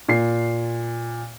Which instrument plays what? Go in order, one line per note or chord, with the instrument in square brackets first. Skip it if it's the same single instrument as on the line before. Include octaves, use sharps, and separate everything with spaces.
[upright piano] A#2 C7